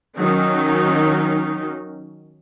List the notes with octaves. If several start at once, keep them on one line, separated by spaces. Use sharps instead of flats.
D#3 F#3 C#4 D#4